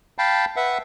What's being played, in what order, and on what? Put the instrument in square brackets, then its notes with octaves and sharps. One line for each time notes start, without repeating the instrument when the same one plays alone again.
[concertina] F5 G5 A5 B5
B4 E5 F#5